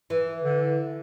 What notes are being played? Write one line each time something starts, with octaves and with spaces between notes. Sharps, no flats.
E3
D3